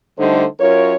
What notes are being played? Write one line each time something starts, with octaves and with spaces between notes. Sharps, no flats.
D3 G3 A3 D#4 C5
F#2 F4 A#4 C#5